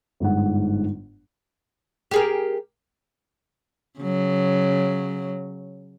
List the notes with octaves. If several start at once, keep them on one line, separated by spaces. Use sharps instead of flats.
G1 G#2 F#5
G4 G#4 A#4
C#3 F#3